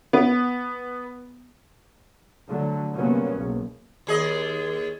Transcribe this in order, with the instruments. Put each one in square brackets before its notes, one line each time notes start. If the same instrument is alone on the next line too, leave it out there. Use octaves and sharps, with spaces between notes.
[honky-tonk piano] B3
[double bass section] D3 F#3 A3
G2 C3 F#3 A#3 B3 C#4
F#1 B1
[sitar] D#2 G#4 D#5